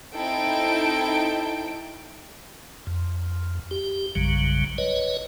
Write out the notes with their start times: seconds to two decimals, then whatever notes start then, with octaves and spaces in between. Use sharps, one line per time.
0.15 C4 D#4 E4 A4 G5 D7
2.87 F2
3.71 G4
4.15 A#1 F#2 C#3 F#3 G3
4.78 B4 C#5 D#5